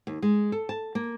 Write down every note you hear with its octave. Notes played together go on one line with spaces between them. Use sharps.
D#2
G#3
A4
A5
A#3